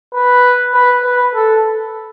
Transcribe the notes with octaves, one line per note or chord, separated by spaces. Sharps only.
B4
B4
B4
A4